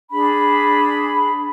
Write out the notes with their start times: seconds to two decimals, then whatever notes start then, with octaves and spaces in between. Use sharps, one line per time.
0.12 D4 G#4 B5